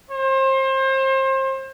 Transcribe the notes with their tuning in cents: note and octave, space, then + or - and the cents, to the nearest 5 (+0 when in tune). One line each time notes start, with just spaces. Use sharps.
C5 +30